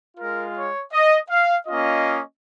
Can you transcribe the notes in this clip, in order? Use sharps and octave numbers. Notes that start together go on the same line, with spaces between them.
G#3 F4 A#4
C#5
D#5
F5
A#3 C#4 F4 D#5